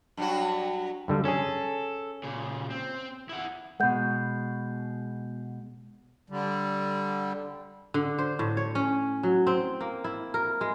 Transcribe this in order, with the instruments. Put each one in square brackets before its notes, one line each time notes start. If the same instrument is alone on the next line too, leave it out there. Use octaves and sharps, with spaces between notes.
[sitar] G2 F#3 F#4
[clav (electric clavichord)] G2 D3 G3
[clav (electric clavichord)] C#4 G#4 [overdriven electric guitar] A4
[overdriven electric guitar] A#2 C#3
C4
E4 F#5
[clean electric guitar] B2 G#3 [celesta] F#5 G6
[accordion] D3 G3
[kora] D3
C5
A2
C#5
C#4
F#3
C4
A#3
E4
A#4
G#3